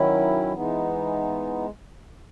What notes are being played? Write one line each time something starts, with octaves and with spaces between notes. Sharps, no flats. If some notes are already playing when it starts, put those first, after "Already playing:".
Already playing: D#3 F#3 C#4 E4
E3 G#3 B3 D#4